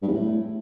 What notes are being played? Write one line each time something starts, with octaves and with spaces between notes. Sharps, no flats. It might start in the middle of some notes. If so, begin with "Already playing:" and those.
G2
E2
A2